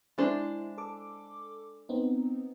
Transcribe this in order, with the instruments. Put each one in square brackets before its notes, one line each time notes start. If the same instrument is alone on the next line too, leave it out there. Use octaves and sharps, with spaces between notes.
[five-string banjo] G#3 D4 C5 [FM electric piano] E4
[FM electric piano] A4 D6
B3 C4 D#4